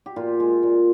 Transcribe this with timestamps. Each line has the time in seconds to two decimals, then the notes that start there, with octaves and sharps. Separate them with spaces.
0.06 G4
0.16 A#2 F4
0.40 G#3
0.63 A#2